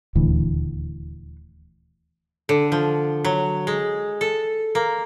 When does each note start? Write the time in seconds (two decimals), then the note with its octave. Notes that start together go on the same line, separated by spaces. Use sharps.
0.15 D#1 D2 E3
2.49 D3
2.72 F3
3.25 F#3
3.67 G#3
4.21 A4
4.75 A#3